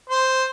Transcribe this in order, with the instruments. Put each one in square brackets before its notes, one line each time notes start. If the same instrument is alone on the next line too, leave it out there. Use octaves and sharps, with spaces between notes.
[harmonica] C5